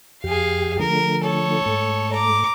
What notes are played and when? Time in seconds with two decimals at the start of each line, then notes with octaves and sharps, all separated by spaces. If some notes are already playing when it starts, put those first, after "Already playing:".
0.24 F2 G4 G#4 F5
0.79 D3 F3 A3 A#4
1.24 A4 C#5
1.66 G#2 A3
2.13 A#5 D6